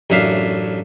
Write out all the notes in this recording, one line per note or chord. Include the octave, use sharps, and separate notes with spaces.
A1 F#2 D4 E5 F5